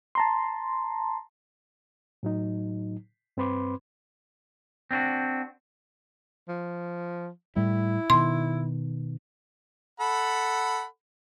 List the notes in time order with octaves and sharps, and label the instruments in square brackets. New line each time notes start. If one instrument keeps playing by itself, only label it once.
[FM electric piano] A5 A#5 C6
[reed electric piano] A2 F#3 D#4
G2 C4 B4 B5 C6 D6
[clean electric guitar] C4 D4 F4 F#4
[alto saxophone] F3
[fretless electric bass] A2 G3 [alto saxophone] E4
[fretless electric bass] B2 D#3 [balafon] C6
[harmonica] A4 F#5 B5